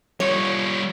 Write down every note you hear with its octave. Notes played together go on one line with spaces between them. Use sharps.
G3 F4 C#5